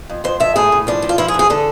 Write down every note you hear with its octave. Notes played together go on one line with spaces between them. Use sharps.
F2
F2 C5
F2 E5
A2 G#4
A2
F3 D4
F3
F4
F3 E4
G#4
D3
G#4
D3 A4